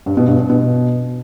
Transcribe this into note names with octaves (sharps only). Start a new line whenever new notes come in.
G2
B2
G2
G2
B2